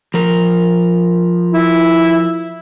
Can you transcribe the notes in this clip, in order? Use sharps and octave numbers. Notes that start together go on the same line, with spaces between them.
F3 A#4
E4